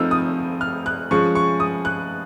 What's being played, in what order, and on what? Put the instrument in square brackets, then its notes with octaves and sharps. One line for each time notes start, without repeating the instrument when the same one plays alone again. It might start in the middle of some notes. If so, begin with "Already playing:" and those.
Already playing: [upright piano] F3 A3 C4 D#4 E6 F6
D#6
F6
F#6
F3 G#3 C#4 C#6
C#6
D#6
F#6